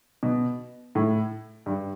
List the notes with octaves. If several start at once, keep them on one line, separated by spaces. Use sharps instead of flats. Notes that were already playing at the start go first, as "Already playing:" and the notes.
B2
A2
G2